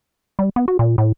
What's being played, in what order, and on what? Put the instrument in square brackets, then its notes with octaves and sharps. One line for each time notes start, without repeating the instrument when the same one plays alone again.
[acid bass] G3
B3
F#4
A#2
A2